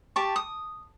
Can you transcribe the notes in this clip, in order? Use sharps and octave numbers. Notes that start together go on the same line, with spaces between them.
G4 A5 C#6
D#6